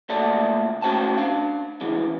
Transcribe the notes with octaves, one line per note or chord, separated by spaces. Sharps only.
C#2 A#2 A3 A4 D5
A3 C#4 F#4 C5 G5 A5
D4 F5
E2 C#3 E3 G#3